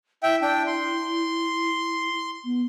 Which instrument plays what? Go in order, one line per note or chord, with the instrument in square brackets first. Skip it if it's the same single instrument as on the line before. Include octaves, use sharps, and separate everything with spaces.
[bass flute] E4 [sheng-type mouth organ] E5 G5
[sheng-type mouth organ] D4 G5
C6
[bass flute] B3